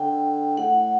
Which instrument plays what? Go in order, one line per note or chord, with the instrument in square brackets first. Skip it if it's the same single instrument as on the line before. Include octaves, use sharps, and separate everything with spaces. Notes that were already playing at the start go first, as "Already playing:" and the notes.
Already playing: [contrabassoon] D3 [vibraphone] G5
[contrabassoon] A2 [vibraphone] F#5